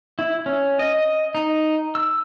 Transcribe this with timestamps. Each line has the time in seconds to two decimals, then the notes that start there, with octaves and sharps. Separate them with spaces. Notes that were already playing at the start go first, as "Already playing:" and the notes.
0.19 E4
0.46 C#4
0.79 D#5
1.35 D#4
1.95 E6